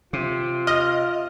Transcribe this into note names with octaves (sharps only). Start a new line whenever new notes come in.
C3 F4
D#5 F6